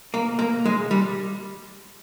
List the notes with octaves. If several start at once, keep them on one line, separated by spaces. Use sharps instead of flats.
A#3
A#3
G#3
G3